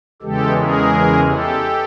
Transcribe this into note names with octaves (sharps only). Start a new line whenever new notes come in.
E2 C#3 E3 G#3 G4 A4
G#4 A#4
G4 A4